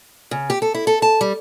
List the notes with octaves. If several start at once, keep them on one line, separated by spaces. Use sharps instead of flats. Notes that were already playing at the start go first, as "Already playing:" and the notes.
C#3
G4
A4
E4
A4
A5
G3